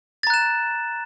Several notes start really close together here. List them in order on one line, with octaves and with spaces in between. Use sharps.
A6 A#5 F#6 E7